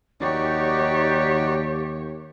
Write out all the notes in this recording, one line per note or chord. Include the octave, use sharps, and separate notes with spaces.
D#2 D#4 F#4 G4 C#5 D5